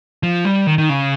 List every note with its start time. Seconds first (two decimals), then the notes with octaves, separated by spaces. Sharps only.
0.23 F3
0.45 G3
0.67 D#3
0.78 D#3
0.89 C#3